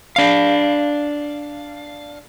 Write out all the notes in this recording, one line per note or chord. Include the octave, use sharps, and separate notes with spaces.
D4 F5